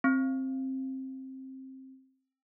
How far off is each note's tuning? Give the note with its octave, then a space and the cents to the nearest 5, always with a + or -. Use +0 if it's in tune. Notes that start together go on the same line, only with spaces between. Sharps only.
C4 +15